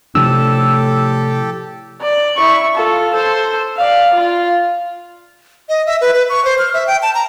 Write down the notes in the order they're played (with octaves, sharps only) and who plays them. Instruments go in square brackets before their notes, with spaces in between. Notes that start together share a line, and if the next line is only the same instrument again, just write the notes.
[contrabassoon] A2 [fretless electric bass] C3 F3 D4 [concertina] G4 A4 [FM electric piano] E6
[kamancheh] D5
E4 C#6
F4 A4
A4 C5
D5 F5
F4
[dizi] D#5
E5
B4
B4
C#6
C5
F6
E5
G5
A5
A#5